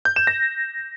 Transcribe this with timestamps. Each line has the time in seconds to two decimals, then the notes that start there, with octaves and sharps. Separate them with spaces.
0.05 G6
0.16 E7
0.27 A#6